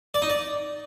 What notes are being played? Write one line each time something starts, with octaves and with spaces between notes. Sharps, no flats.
D5
D#4
D5